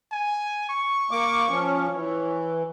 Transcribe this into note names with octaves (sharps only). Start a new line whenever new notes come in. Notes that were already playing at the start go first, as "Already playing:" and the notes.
G#5
C#6
A#3 D6
F3 C#4
E3 C#5